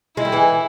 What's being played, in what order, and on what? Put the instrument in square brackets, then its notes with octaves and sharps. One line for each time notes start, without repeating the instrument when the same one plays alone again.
[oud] G#3 [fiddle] E4
[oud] G3
E3 G#3